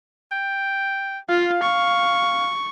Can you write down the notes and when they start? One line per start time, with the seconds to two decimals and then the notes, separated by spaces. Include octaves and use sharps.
0.32 G5
1.29 F4 F5
1.63 C#6